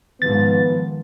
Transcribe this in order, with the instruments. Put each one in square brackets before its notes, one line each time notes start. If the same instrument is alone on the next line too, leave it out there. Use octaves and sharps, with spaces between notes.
[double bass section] G#2 F3 [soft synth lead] D#3 [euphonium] B3 [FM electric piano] A6